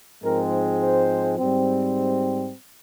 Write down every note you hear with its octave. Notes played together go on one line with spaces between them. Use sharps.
G#2 F3 G#3 C4 A#4
C5
G#2 G3 C4